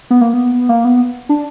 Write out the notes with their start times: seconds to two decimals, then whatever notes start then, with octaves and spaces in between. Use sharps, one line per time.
0.10 B3
0.21 A#3
0.34 B3
0.69 A#3
0.85 B3
1.29 D4